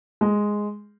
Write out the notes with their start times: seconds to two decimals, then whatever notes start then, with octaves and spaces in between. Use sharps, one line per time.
0.21 G#3